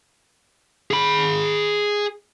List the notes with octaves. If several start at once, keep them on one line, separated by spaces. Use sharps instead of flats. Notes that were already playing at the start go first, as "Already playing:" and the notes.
G#4 B5